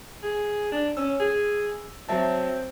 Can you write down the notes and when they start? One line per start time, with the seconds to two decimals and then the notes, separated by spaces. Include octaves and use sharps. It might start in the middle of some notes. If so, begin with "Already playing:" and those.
0.23 G#4
0.72 D4
0.97 C#4 E6
1.20 G#4
2.09 F#3 C4 E5 A5